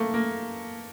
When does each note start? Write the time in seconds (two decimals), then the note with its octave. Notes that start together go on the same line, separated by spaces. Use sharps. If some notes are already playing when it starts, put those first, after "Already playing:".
Already playing: A3 A#3
0.14 A#3